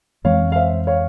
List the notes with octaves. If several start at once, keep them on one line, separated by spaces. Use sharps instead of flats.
F2 E3 G#3 C4 C#5 F5
F5
C5 E5
C#5 F5